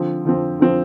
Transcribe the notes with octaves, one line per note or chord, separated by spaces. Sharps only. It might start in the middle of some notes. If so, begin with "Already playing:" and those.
Already playing: D3 F3 C4
D3 F3 C4
D3 F3 C4